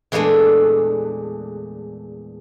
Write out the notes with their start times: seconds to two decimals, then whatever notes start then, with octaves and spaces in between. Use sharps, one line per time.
0.12 E2 A#2 E3 G#3 A3 D4